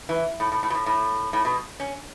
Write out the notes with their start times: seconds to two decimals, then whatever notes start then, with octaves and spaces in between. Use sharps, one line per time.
0.09 E3
0.40 A2
0.52 A2
0.63 A2
0.70 B2
0.75 A2
0.86 A2
1.33 A2
1.45 B2
1.80 C#4